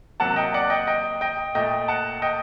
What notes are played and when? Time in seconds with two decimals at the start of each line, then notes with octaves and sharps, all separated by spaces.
0.20 C3 F#3 A#3 F#5 A5
0.36 D#5 G5
0.54 D5 F#5
0.70 D#5 G5
0.87 D#5 G5
1.21 D#5 G5
1.55 A#2 A3 D#5 G5
1.88 F#5 A5
2.22 D#5 G5